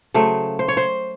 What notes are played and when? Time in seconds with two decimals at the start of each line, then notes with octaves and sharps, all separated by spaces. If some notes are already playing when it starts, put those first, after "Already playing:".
0.14 C#3 F#3 A3 C5
0.59 C5
0.68 C#5
0.77 C5